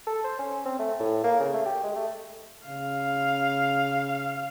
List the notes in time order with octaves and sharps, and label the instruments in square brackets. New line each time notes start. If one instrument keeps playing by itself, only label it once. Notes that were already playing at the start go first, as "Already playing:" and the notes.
[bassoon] A4
C5
C#4
C4
A3
A2
A#3
C#3
A3
G4
G#3
A3
[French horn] C#3 [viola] F5